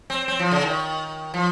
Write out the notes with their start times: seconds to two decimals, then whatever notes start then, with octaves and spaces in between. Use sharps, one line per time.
0.10 C4
0.28 C4
0.39 F3
0.51 C#3
0.63 D#3
1.34 F3